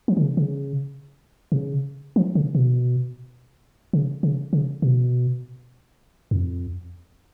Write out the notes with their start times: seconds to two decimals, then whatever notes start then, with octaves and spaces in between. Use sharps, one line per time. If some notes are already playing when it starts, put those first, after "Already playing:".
0.08 F3
0.17 D3
0.23 C#3
0.37 C#3
1.52 B2
1.56 C#3
2.16 F3
2.35 C#3
2.55 B2
3.93 C#3
4.23 C#3
4.53 C#3
4.82 B2
6.31 F2